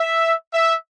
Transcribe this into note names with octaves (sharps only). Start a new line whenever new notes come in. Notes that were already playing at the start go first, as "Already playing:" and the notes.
Already playing: E5
E5